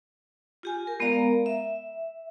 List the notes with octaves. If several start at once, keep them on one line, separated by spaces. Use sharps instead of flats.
F4 G4 G#5
A#4
G#3 B3 A#4 D5 F5 A#5
E5